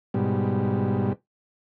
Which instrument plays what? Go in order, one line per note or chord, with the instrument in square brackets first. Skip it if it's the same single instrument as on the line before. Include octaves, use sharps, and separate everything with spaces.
[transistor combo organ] G#2 B2 G3